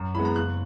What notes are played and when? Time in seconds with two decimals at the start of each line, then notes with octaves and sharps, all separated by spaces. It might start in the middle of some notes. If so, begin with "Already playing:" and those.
Already playing: F#2
0.15 E3 G#3 B3 B5
0.25 A#5
0.36 F#1 F#6